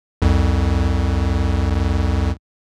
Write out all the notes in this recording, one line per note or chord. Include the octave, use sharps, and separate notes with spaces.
C2 F2